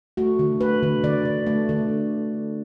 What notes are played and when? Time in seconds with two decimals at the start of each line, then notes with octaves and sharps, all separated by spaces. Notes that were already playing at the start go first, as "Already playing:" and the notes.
0.17 A3 F#4
0.39 D3
0.61 A3 B4
0.83 D3
1.03 D3 D5
1.25 D3
1.47 A3
1.69 D3